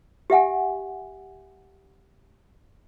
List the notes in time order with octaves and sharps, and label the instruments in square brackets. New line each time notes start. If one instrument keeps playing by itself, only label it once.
[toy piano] G4 E5 F#5 G#5